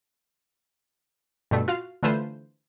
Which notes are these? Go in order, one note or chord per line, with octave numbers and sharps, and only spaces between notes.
G2 B2 D3 A3
F4 F#4 F5
D3 E3 A3 F4 B4 C5